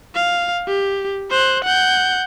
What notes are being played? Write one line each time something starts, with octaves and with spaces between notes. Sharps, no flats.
F5
G4
C5 F#6
F#5 G6